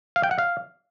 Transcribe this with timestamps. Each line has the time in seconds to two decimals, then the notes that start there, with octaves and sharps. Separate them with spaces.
0.16 F5
0.24 G5
0.31 F#5
0.38 F5